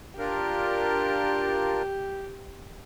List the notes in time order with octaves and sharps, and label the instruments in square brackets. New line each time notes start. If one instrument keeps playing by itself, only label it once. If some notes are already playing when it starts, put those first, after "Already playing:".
[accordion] D4 F4 A#4 [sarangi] G4